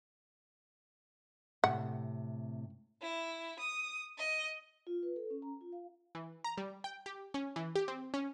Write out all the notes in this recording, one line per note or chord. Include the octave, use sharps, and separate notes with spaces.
A2 C3 F#5
E4
D#6
D#5
F4
B4
A4
C#4
A#5
F4
F5
E3
A#5
G3
G5
G4
C#4
E3
G4
C4
C#4